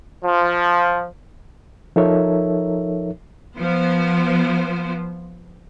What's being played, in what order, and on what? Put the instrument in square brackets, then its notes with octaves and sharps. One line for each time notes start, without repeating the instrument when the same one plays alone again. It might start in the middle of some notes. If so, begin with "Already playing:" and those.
[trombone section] F3
[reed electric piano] F3 D#4 A4 A#4 C#5 E5
[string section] F3 B3 C5